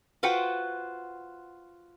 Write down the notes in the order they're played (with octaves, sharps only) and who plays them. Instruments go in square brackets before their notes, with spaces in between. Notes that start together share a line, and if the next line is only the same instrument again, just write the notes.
[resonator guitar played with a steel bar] F4 F#4 B4 C5 F#5 G5